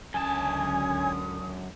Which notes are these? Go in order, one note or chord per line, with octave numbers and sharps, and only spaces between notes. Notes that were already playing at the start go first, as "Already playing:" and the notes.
C#2 F#2 D3 C#4 G#5 A5 D#6